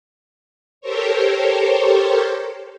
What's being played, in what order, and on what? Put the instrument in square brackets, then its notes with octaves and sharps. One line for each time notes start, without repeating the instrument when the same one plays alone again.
[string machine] G4 A4 A#4 C5 C#5